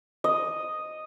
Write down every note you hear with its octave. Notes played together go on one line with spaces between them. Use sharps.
D#5